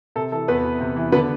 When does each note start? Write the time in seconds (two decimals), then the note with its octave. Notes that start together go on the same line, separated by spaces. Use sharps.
0.16 C3 A4
0.32 E3 A4
0.48 E2 B3 B4
0.64 E2
0.80 C3
0.96 E3
1.12 D3 B3 B4